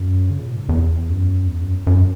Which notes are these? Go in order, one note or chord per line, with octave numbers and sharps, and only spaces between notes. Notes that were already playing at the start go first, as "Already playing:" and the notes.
Already playing: F#2
C#3
A#2
G#2
E2
F#2
E2
F#2
F#2